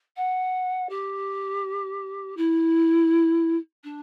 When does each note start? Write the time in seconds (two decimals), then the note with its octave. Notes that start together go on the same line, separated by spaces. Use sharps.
0.16 F#5
0.89 G4
2.37 E4
3.84 D4